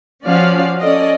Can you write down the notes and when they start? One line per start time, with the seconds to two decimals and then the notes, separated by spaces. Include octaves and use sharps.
0.24 F3 C#4 F#4 D5 F5
0.80 C#4 A4 D5 D#5